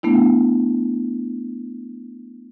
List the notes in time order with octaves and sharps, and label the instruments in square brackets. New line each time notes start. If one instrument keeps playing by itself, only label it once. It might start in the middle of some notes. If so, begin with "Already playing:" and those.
[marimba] A3 B3 D4 E4